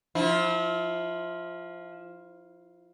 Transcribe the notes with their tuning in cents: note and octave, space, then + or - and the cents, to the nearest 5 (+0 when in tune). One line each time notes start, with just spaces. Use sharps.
F3 +0 E4 -30